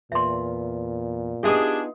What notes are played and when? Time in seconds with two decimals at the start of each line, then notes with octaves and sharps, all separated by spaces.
0.12 E2 A#2 E5 C6
1.44 B3 D4 D#4 F4 G4 G#4 E5 D#6